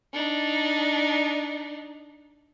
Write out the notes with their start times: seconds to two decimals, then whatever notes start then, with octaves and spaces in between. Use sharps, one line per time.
0.13 D4 D#4